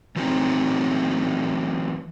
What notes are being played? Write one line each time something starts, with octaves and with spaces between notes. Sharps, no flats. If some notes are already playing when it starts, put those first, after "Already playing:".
E3 F#3 A3 C4 D#4